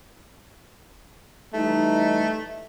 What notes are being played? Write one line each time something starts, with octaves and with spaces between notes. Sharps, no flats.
E3 G3 A3 D#4